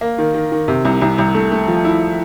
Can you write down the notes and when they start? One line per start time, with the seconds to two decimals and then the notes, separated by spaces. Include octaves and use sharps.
0.01 A#3
0.18 D#3
0.34 D#3
0.52 D#3
0.68 C3
0.85 C2
1.01 C2
1.18 C2
1.35 A3
1.52 A3
1.68 F3
1.85 E4